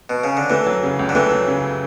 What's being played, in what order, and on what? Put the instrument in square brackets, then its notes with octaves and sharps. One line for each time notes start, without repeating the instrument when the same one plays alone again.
[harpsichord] B2
C#3
D3
[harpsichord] E3 [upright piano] A3
[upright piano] F#3
C#3
C#2
[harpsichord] D3
[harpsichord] E3 [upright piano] A3
[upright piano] F#3
C#3